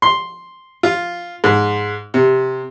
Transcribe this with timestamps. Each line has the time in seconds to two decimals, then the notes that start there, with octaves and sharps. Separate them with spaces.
0.02 C6
0.83 F4
1.44 G#2
2.14 C3